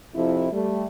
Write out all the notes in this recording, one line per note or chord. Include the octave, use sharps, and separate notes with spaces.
F2 C3 F3 E4
G3 A3